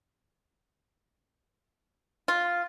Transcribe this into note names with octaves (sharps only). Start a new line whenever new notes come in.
F4